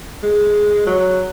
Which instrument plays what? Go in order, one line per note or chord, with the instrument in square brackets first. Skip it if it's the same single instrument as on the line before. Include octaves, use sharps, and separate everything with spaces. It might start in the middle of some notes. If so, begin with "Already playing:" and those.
[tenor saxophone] G#3
F#3